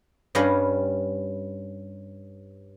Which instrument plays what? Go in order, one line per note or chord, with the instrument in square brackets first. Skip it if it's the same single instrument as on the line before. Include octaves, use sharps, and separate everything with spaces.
[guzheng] G2 G3 C#4 D#5 F5 B5